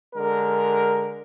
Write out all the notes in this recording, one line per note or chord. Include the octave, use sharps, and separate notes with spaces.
D3 G#3 A#4